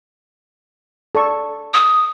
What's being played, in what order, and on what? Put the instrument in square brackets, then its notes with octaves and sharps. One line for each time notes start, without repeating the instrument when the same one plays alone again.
[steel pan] A4 D5 C#6
[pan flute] D#6